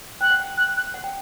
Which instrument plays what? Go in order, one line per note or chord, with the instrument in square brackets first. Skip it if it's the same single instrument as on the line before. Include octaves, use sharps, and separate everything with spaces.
[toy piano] G5 [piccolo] F#6
[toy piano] F#5
G5
[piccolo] F#6
F#6
[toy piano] F#5
G5